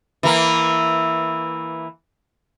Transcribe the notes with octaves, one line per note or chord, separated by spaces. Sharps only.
E3 A#3